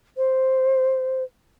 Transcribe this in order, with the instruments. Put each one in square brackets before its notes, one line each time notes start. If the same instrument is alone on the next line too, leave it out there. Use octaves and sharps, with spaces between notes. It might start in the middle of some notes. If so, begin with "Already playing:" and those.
[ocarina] C5